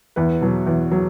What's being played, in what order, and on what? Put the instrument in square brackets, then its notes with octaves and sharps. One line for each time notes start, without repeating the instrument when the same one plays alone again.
[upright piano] E2 B4
B2 F#3
E2
F#3